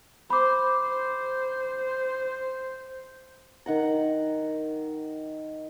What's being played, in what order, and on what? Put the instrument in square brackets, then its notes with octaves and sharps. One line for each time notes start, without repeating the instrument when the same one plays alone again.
[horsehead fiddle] C5 [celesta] B5 D6
[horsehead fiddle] C5
[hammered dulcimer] D#3 F#5 A#5